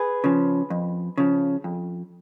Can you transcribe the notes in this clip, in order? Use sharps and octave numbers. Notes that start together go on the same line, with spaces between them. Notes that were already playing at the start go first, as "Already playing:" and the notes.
Already playing: G#4 B4
C#3 F3
F2
C#3 F3
F2